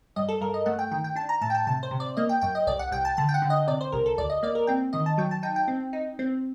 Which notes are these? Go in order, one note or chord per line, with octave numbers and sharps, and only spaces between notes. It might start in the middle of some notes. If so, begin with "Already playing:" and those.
G2 D#5
A4
G2 A#4
D#5
A3 F#5
G5
D#3 G5
G5
D4 A5
A#5
A2 A5
G5
A5
C3 A5
C5
C3
D5
A#3 D#5
G5
F#2 G5
D#5
C2 D5
F#5
C2 G5
A5
D3 A5
G5
F#5
D3
D#5
C3 D5
C5
C2 A#4
A4
D2 D5
D#5
A#3 D5
A#4
C4 G5
D#3 D#5
A5
F#3 G5
A5
D#4 G5
G5
C4
D#4
C4